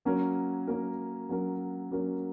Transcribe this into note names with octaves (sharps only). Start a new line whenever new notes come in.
F#3 A#3 C#4 A#4
F#3 A#3 C#4 A#4
F#3 A#3 C#4 A#4
F#3 A#3 C#4 A#4